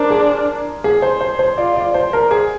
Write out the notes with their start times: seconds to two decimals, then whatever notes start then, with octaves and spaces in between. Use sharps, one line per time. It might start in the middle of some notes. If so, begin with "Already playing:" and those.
Already playing: D4 A#4 C5
0.10 G#4
0.84 G#4
1.02 C5
1.21 C5
1.39 C5
1.58 F4 D5
1.76 D5
1.94 C5
2.13 A#4
2.31 G#4